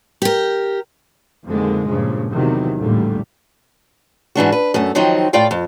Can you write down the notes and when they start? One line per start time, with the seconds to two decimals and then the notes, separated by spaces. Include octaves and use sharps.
0.22 G4 A#4
1.46 F2 A#2 D3 D#3 G#3
1.87 G2 A#2 C#3 F3
2.30 E2 C3 D#3 F#3
2.77 A1 E2 A#2 D3 G3 A3
4.35 G#2 E3 D4 F#4
4.52 B4
4.74 F#2 A3
4.95 D#3 F3 F#3 C4 D#4
5.33 A2 F4 D5 F5 G5
5.51 F2